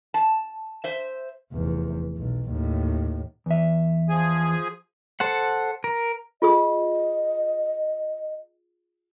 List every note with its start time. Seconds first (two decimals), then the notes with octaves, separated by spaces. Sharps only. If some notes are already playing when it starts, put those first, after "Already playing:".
0.14 A5
0.84 C5 E5
1.53 F1 E2
2.17 B1
2.51 D#2 A2
3.46 E2 E5
4.09 F3 G#4 G#5
5.20 A4 C5 F#5
5.84 A#4
6.42 F4 G#4 D#5 D#6